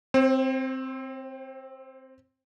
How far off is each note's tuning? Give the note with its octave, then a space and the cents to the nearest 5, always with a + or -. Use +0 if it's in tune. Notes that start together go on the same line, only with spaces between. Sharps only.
C4 +0 C5 +40